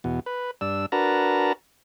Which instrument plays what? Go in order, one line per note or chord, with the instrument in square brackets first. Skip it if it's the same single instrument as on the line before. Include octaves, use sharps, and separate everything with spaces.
[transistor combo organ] E2 B2
B4
G2 D4 E6
D4 F#4 A#4 B4 A5 A#5